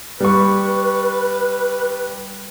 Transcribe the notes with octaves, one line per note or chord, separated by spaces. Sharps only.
G3 B4 C#6